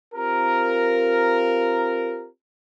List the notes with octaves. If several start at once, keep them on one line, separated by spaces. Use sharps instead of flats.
C4 F4 G4 A#4